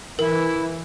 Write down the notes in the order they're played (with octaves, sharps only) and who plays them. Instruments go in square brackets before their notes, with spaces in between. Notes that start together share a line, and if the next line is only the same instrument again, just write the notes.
[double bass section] E3 [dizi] E4 [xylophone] A#4